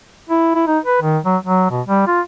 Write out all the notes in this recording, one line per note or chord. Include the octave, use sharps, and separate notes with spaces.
E4
E4
D#4
B4
D#3
F#3
F#3
B2
G3
F4